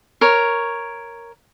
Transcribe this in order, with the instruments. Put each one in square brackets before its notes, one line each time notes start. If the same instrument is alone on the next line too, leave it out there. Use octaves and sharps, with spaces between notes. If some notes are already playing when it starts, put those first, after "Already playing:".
[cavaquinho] A#4 C#5